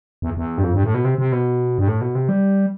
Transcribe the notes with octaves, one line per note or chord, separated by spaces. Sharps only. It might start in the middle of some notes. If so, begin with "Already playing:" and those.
E2
E2
G2
F2
G2
A2
B2
C3
C3
B2
G2
A2
B2
C3
G3